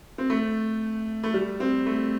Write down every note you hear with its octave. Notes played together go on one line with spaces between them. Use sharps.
C4
A3
A3
G3
C4
A3